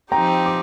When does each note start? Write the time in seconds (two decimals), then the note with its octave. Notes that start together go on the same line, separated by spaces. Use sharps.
0.11 F3 C4 D#4 G4 G5 A#5
0.46 D6